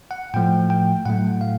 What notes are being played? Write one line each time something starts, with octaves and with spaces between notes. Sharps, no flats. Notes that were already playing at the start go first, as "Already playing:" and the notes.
F#5
A2 F3 A3 G5
G5
A2 F#3 A3 F#5
F5